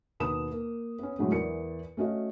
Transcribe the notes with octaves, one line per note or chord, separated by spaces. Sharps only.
D#2 B2 B3 B4 D#6 E7
A#3
B3 C#4
A2 F#3 G#3 C4
E2 E3 A#4 D5 C#7
A3 C#4 F#4 D#5 F5